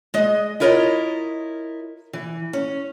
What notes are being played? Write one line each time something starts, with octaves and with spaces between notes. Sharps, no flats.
G#3 D#5
E4 F4 A#4 C#5 D#5
E3
C#4